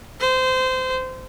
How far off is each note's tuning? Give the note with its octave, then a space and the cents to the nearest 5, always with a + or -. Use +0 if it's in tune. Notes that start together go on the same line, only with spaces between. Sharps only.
C5 -20